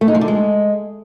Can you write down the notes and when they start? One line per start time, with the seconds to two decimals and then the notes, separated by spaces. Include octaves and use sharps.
0.01 A3
0.08 D#4
0.15 F3
0.21 D3
0.28 G#3